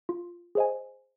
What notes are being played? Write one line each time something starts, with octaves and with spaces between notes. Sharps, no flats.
F4
G#4 C5 D#5 G#5